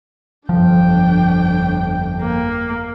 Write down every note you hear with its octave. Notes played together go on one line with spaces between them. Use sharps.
G1 F2 F3 D4 G5
A#3